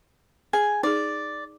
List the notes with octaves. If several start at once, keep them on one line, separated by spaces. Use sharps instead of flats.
G#4 G#5
D#4 G#4 D5